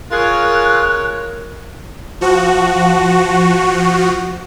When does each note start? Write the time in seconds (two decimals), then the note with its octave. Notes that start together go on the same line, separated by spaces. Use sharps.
0.12 F4 G#4 A#4 C#5 F#6
2.21 F3 F#4